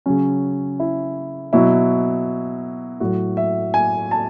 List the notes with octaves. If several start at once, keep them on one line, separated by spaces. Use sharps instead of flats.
C#3 F#3 C#4
E4
B2 F#3 E4
A2 F#3 F#4
E5
G#5
A5